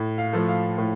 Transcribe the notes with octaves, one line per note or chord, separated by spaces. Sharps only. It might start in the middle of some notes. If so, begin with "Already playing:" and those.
Already playing: A2
F5
F3 A3
F5
A2